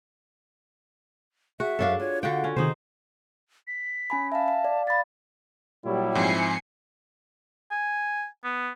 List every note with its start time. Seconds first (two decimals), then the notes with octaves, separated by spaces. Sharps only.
1.60 F#4 G#4 E5
1.79 F#2 D4 A4 C#5 F5
2.00 F4 C#5
2.23 D3 F#4 F5 G5
2.44 C#4
2.56 C3 D#3 D#4 G#4 C5
3.67 B6
4.10 C#4 G#5 B5
4.32 E5 F5 A5
4.48 F5
4.64 D5
4.87 F5 B5 A6
5.85 A#2 F#3 G3 E4
6.15 G#2 F3 C4 G#5 C7 C#7
7.71 G#5
8.44 B3